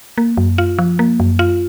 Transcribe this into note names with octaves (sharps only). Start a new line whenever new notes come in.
A#3
F#2
F4
F3
A#3
F#2
F4